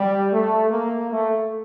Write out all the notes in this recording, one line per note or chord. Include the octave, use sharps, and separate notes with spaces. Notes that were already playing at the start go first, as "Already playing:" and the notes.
Already playing: G3
A3
A#3
A3